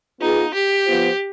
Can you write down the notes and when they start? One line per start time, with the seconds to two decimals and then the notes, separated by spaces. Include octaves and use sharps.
0.21 B3 D#4 F4 G#4
0.54 G4
0.86 F3 B3 F4 C5